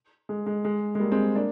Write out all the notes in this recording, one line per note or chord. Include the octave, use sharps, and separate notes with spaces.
G#3
G#3
G#3
G#3
G3 A#3
G#3 C4
A#3 D4